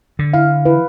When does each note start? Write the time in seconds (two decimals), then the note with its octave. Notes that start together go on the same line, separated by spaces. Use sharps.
0.19 D3
0.33 E4 F5
0.65 E3 B4